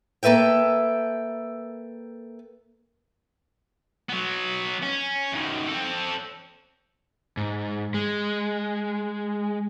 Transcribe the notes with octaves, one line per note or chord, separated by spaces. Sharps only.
A#3 A4 B4 E5 G5
F#3 B3
C#4
F#2 D#3
C4 A4
G#2
G#3